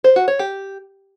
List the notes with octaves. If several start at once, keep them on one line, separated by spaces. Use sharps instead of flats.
C5
F#4
C#5
G4